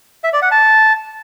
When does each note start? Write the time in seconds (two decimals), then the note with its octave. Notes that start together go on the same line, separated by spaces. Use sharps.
0.24 E5
0.33 D5
0.42 F#5
0.51 A5